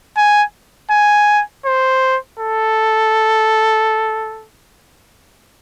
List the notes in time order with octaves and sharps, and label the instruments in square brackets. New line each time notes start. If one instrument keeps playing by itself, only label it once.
[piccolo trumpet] G#5
G#5
C5
A4